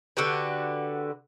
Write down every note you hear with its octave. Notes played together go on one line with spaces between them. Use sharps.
D3 F#4 G4 B4